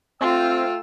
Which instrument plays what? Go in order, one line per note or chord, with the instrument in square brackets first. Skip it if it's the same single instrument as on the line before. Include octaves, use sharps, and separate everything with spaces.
[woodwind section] A3 G5 E6 [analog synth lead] C4 [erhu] F4